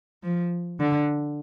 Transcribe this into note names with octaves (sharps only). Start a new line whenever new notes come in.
F3
D3